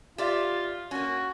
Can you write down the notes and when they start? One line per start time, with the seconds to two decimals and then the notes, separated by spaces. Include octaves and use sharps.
0.18 F4 G4 D5 E5
0.91 A#3 C#4 F#4